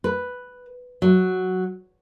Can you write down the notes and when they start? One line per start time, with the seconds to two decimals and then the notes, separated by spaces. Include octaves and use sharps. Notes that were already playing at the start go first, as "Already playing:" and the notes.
0.04 B4
1.02 F#3